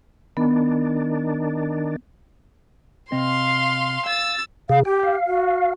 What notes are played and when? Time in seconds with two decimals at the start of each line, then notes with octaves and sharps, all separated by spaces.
0.37 D#3 B3 D4
3.12 C3 C4 D#5 F5 C6
4.06 F5 E6 A6
4.69 C3 G#4 F5
4.85 G4 G5
5.03 F5
5.27 F#4